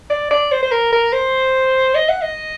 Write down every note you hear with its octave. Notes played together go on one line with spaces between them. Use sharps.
D5
D5
C5
C5
A#4
A#4
C5
D#5
F#5
D#5